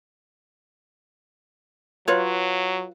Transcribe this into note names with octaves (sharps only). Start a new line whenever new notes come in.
F#3 F4 B4 C#5